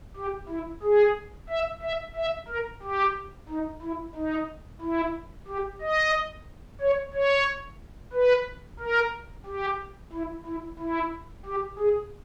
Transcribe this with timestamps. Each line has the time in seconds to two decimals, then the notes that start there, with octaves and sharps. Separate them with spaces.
0.17 G4
0.49 E4
0.83 G#4
1.50 E5
1.82 E5
2.16 E5
2.48 A#4
2.83 G4
3.49 D#4
3.82 E4
4.15 D#4
4.81 E4
5.48 G4
5.81 D#5
6.81 C#5
7.14 C#5
8.13 B4
8.80 A#4
9.46 G4
10.13 E4
10.46 E4
10.79 E4
11.46 G4
11.79 G#4